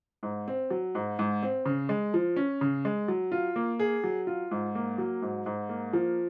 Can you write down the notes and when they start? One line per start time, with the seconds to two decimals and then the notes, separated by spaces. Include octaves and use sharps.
0.23 G#2
0.48 C4
0.70 F#3
0.95 G#2
1.19 G#2
1.43 C4
1.65 C#3
1.89 G#3
2.14 F3
2.36 C#4
2.61 C#3
2.85 G#3
3.08 F#3
3.32 F4
3.56 A#3
3.79 G#4
4.04 F#3
4.27 F4
4.51 G#2
4.75 A#3
4.98 F#3
5.22 G#2
5.46 G#2
5.69 A#3
5.93 F3